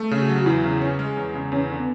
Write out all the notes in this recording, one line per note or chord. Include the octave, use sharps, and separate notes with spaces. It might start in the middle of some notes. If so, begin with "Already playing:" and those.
Already playing: A3
C#3
F#4
F#3
F#4
E2 E4
C#3
C#4
G#3
E2
C#3
E2 C#4
D3
B3